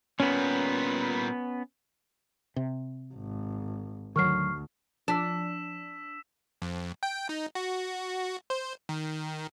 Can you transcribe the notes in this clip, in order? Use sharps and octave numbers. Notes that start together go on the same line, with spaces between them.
A#2 G3 B3 C#4
C3
G#1
D2 D#3 F#3 C#6 F6 C7
F3 D4 E6 B6 E7
F2
G5
D#4
F#4
C5
D#3